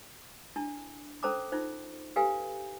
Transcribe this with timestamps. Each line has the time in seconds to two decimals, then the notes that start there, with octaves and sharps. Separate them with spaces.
0.56 D4 E4 A5
1.23 C#4 A4 C5 A5 A#5 D6
1.52 D#4 F4 C5
2.16 G4 A4 B4 F5 G#5